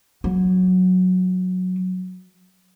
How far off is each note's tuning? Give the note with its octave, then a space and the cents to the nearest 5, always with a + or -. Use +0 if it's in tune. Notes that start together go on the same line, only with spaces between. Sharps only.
F#3 -10